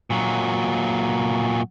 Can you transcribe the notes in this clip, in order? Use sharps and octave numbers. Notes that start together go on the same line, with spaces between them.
A#2 F#3